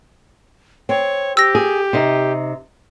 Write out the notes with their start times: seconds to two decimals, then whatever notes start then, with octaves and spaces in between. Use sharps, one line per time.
0.89 C4 C#5
1.37 G4 E6 A#6
1.55 G#4
1.93 C3 D#4